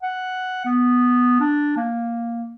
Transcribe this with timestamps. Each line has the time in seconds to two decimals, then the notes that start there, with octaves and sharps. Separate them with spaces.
0.03 F#5
0.65 B3
1.40 D4
1.76 A#3